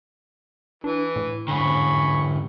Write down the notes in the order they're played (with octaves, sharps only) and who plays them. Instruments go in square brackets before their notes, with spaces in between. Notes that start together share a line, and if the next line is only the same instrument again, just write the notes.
[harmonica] E3 [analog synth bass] D4
[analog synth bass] A2
[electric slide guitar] G#2 D3 [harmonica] G#5 B5 C#6